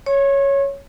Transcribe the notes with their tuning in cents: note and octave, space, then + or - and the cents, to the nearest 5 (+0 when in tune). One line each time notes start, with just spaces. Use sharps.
C#5 +0 C#6 -40